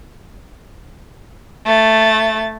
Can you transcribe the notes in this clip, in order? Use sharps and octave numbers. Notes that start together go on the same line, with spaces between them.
A3 A6